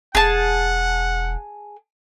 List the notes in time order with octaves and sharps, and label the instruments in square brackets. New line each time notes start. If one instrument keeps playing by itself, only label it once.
[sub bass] E1 [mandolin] G#4 A5 [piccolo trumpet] F#5